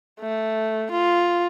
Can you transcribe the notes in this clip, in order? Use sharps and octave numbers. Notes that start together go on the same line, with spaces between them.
A3
F4